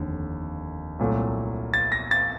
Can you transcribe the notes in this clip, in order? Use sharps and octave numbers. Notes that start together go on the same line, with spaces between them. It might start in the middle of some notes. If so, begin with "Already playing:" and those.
Already playing: F1 D#2 D3
C2 A#2 F#3 A3
A6
A#6
A6